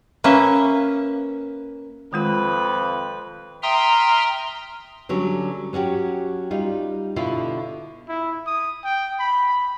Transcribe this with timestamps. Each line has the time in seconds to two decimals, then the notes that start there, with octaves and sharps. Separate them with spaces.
0.24 A#3 C#4 B4 E5
2.13 F2 D#3 G#3 F4 B4
3.63 E5 G5 A#5 C6 D#6 F6
5.09 D3 F#3 G3 C#4
5.73 F#3 C#4 F#4 G4
6.51 G3 D#4 F4
7.16 B2 D3 E4 F4
8.09 E4
8.47 D#6
8.84 G5
9.19 B5